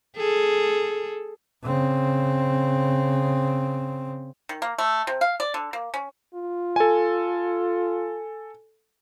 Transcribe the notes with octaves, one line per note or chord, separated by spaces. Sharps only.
G#4 A4
C#3 C4
D#3
A#3
A3
C3
F5
D5
D3
A#3
C#4
F4
A4 G#5